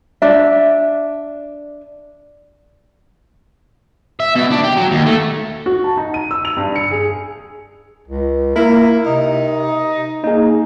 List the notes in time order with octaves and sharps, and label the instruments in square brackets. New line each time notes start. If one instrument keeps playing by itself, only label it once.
[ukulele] D4 E5
[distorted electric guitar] E5
B2
D4
G4
F#3
D#2
A3
[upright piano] F#4
A5
D#4
D#7
E6
F7
G2
C#7
G#4
[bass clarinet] C#2
[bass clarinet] A#3 [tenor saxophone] E4 [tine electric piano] A#4
[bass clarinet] C3 [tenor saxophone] D#4
[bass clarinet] A#3 [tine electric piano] D#4 G#4